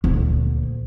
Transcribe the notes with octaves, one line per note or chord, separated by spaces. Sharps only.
D2 A#2